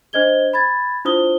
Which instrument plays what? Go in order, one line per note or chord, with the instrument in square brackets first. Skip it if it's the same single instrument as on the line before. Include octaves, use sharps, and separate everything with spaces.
[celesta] D4 C5 D#5 G#6 G7
B5 G#6 A6
D4 E4 F4 C5 D#6 G7